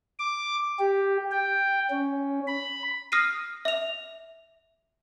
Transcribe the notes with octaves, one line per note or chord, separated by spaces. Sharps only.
D6
G4
G5
C#4
B5
D#6 F6 A#6 C7 D#7
E5 F7